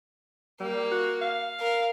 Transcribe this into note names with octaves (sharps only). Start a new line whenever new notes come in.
G3 A#3
F#4
F5
A#4